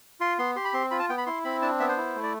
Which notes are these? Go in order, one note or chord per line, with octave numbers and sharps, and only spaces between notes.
F4 C6
B3 C6
G4 C6
B5
C4 C6
F4 B5
A5
B3 G5
B5
E4 C6
C4 B5
D4 A5
B3 E5
C5
E4
A3
D5